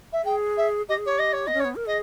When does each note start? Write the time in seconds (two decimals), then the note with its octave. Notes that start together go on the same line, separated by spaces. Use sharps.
0.12 E5
0.24 G#4 G5
0.57 E5
0.88 G4 D#5
0.98 G#4
1.05 G4 C#5
1.18 D#5
1.32 C#5
1.46 B3 D#5
1.54 C#4
1.59 C#5
1.65 B3
1.76 A#4
1.86 G#4 D#5